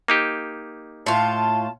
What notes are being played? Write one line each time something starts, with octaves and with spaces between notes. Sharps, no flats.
A#3 D#4 G4
A2 F4 A5